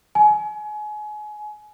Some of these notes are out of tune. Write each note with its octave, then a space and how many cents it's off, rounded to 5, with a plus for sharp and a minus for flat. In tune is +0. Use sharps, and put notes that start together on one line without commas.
G#5 +30